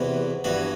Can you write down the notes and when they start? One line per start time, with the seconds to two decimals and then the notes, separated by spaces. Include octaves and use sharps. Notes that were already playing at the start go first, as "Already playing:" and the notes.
Already playing: E2 C3 E3 B3 F#4
0.44 G2 E3 B3 F#4